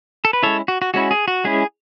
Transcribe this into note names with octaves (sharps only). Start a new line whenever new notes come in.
A4
B4
G#3 C#4 E4 A4 C#5
F#4
F#4
G#3 C#4 E4 F#4
G#4
F#4
G#3 C#4 E4 G#4